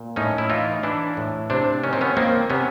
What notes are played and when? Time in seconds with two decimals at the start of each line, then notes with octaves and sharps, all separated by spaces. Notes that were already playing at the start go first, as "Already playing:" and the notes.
Already playing: A#2
0.16 A2 C#4 D#4
0.38 E4
0.50 E3 D#4 F4
0.83 E3 D4 E4
1.17 A2
1.50 C3 C4 D4
1.83 D#3 C#4
1.93 C4
2.01 B3 C#4
2.16 D#3 A#3 C4
2.50 C3 B3 C#4